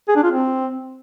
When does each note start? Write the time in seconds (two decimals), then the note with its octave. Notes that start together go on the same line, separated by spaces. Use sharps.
0.08 G#4
0.16 D4
0.23 F4
0.31 C4